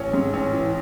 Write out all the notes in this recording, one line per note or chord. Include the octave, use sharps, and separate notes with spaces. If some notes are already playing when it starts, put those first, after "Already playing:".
Already playing: A1 C#4
G#2
A1 C#4
E3